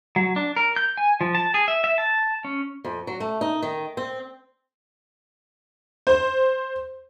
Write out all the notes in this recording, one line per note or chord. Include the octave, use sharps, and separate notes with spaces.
F#3
D4
A#4
G6
G#5
F3
A5
G#4
E5
E5
A5
C#4
F2
F#3
A3
D#4
D#3
C4
C5